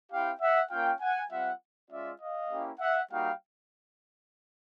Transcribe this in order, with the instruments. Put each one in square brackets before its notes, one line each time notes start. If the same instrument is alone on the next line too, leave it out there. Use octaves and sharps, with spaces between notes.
[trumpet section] C4 E4 G4 F5 G5
E5 F#5
A#3 C#4 F4 F5 G5
F#5 G#5
G3 C4 F4 E5 F#5
G#3 C#4 F4 D5 E5
D#5 F5
A#3 C#4 E4 G4
E5 F#5
G3 A#3 D#4 F#4 F5 G5